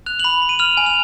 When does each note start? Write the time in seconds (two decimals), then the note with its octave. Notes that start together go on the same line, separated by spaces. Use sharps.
0.06 F#6 F7
0.19 F#7
0.24 B5 F7
0.42 B5
0.49 D#7
0.59 F6 F7
0.77 G#5
0.86 F7